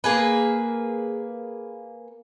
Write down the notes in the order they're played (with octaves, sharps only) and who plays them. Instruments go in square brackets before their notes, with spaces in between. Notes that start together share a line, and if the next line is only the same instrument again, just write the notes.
[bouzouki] A#3 G#4 B4